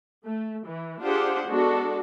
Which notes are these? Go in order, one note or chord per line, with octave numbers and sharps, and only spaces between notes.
A3
E3
D4 F4 G4 G#4 C5 F#5
G#3 B3 D4 F#4 A4